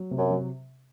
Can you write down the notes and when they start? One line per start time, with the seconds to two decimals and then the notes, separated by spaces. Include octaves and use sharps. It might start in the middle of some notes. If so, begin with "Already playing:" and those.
Already playing: F#3
0.11 C3
0.18 F#2
0.30 F#3